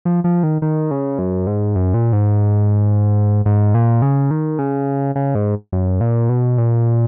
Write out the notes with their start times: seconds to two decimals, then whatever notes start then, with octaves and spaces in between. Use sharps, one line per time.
0.05 F3
0.24 F3
0.43 D#3
0.62 D#3
0.91 C#3
1.19 F#2
1.47 G#2
1.75 F#2
1.94 A#2
2.13 G#2
3.46 G#2
3.74 A#2
4.02 C#3
4.31 D#3
4.59 C#3
5.15 C#3
5.35 G#2
5.72 F#2
6.01 A#2
6.29 B2
6.58 A#2